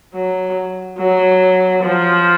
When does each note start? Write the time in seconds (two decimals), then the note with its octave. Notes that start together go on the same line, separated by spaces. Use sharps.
0.15 F#3
0.99 F#3
1.83 F3